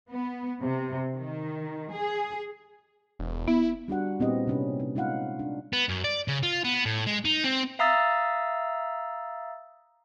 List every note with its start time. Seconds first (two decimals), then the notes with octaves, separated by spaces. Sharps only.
0.10 B3
0.63 C3
1.14 D#3
1.91 G#4
3.19 E1
3.48 B3 E4
3.88 G3 D4 F#4 F#5
4.20 A#2 B3 C4 E4 G4 D#5
4.47 C3 A#3 C#4 D4 B4
4.80 D#4
4.96 G#3 D#4 F4 F5 F#5
5.39 D4
5.73 B3
5.89 F#2
6.04 D5
6.28 C#3
6.43 F4
6.65 B3
6.86 A2
7.06 G#3
7.25 D#4
7.44 C4
7.79 E5 F5 A#5 D#6 E6 A6